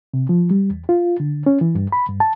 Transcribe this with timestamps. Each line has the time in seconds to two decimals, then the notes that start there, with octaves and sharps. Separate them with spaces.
0.14 C3
0.29 F3
0.51 G3
0.71 E2
0.89 F4
1.20 D3
1.46 C#4
1.61 E3
1.75 G2
1.92 B5
2.08 G2
2.20 A5